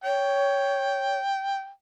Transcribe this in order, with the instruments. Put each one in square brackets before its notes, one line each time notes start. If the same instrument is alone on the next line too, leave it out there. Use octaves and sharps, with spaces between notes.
[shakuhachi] C#5 [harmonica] G5